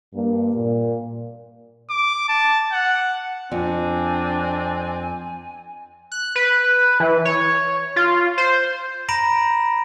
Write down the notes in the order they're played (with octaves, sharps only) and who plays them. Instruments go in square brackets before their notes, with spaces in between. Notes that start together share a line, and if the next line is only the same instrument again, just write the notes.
[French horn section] G2 A#3
A#2
[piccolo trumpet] D6
A5
F#5
[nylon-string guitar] F2 [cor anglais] C4 [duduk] D4 [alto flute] G#5
[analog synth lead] F#6
B4
E3
C#5
F4
C5
[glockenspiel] A#5 B5 A#6 D7 E7